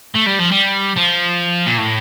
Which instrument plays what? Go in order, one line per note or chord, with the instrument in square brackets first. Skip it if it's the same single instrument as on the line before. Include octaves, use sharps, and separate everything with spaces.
[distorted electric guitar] A3
G3
F3
G3
F3
A#2
A2